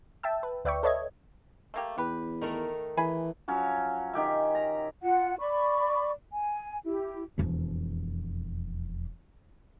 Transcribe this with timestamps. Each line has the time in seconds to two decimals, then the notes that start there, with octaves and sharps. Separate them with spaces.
0.23 E5 G5 A5 E6
0.43 B4
0.65 D2 B4 D5 E5 G5 C#6
0.83 A4 B4 C#5 D#5 E5 G#6
1.74 A3 A#3 G4
1.98 E2 G4 B4
2.41 D#3 A3 A#4
2.97 E3 G#4 G#5 B5
3.48 F3 F#3 C#4
4.13 D#3 G4 E5
4.55 A#5
5.03 F4 F#5
5.39 D5 B5 C#6 D6
6.33 G#5
6.85 E4 G4
7.38 E1 F2